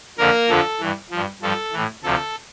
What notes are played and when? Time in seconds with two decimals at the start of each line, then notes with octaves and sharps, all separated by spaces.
0.18 F2 D3 F3 A#3 A#4
0.49 F2 D3 F3 A4
0.80 G2 E3
1.10 G2 F3
1.42 G2 F3 A4
1.72 A2 E3
2.03 D2 C3 F3 A4